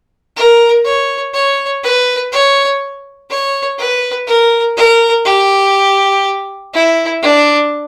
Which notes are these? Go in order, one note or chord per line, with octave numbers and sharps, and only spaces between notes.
A#4
C#5
C#5
B4
C#5
C#5
B4
A#4
A#4
G4
E4
D4